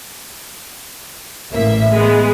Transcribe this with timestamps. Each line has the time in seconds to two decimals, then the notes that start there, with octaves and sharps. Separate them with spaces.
1.52 A1 A#3 E5
1.92 G#3 B3